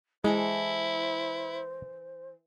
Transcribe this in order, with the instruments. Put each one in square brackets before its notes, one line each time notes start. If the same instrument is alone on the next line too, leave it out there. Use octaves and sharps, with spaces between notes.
[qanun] E3 A4 A#5 [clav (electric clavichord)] G#3 [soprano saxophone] E4 [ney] C5